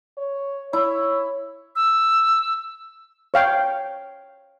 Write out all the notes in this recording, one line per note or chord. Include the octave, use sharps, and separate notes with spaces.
C#5
E4 C#5
E6
C#5 F5 G5